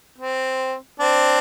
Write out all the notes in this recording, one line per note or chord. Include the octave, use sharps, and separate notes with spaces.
C4
C4 D4